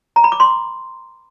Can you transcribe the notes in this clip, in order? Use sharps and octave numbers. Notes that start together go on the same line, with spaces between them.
A#5
B5
D6
C6